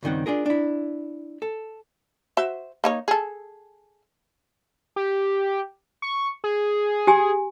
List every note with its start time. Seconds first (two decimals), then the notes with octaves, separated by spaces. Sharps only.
0.03 C#2 G2 D#3 C4 F#5
0.26 D4 F4 G#4 A#4
0.46 D4 E4
1.42 A4
2.37 F#4 C5 E5
2.84 A#3 D#4 C#5
3.08 G#4 A4
4.96 G4
6.02 C#6
6.44 G#4
7.07 G4 G#5